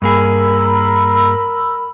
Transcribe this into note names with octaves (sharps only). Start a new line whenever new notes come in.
G2 A#3 G#4 A#4 B5 E6